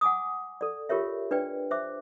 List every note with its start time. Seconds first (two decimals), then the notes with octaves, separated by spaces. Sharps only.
0.01 F#5 G#5 D6 D#6
0.61 A4 D5
0.89 F4 G4 A#4 C#5 E5
1.31 D4 B4 D5 G5
1.71 C5 E5 D6